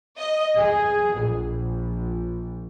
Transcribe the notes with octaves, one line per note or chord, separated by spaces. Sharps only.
D#5
G#4
A#1